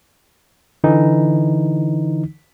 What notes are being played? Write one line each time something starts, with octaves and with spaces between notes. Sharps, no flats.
D3 E3 D#4